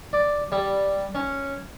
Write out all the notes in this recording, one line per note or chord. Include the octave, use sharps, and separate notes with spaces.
D5
G3
C#4